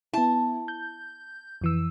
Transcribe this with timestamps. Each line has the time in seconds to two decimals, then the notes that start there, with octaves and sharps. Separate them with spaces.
0.13 B3 E4 A5
0.68 G6
1.61 F2 E3 E6